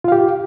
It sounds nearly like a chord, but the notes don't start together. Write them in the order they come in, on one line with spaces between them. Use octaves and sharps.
F4 F5 G4